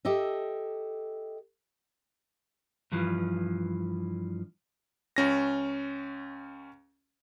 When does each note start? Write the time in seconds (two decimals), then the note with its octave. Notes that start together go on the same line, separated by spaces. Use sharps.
0.05 G4 A4 D#5 E5
2.92 G2 E3 F3
5.16 C#2 C#4 A#6